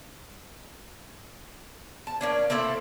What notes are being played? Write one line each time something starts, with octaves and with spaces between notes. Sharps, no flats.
A5
A#3 C#4 D4
A#3 C4 E4 A4